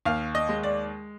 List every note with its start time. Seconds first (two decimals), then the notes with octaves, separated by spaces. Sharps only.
0.05 D#2 F5
0.35 D#5
0.49 G#3
0.63 D5